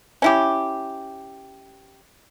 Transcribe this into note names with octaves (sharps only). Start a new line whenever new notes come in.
C#4 E4 G4